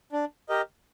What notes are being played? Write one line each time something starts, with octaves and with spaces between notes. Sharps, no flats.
D4
G4 A#4 D#5